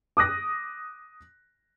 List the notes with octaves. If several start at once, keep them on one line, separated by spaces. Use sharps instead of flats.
D6 D#6 F#6 A#6